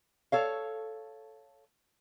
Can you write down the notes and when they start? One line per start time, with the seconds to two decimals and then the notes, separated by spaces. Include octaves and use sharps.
0.32 A4 C#5 F5